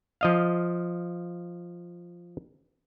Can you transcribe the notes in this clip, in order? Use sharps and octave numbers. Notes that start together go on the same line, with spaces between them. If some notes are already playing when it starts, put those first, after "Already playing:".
F3 D#5 F5